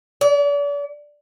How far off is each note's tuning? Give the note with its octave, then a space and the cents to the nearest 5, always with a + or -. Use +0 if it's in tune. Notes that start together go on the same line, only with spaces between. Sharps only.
D5 -40